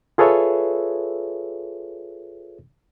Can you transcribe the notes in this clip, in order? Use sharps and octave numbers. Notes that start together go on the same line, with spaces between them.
F4 G#4 A4 B4 C#5 E5